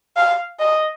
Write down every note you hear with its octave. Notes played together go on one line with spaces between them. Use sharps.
F5
D#5